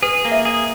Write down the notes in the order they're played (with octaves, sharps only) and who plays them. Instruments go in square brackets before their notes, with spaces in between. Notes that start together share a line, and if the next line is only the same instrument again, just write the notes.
[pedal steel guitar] G#4 [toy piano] B4
[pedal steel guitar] A#3
[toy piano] E5
[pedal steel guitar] G#4